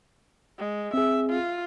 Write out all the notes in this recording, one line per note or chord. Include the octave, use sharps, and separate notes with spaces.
G#3
C4 G#4 E5
F4